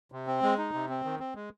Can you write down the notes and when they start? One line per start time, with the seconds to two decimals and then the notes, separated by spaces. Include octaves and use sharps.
0.12 C3
0.27 C4
0.42 G#3
0.58 D#4
0.73 C3
0.89 C4
1.05 D#3
1.19 C4
1.35 G#3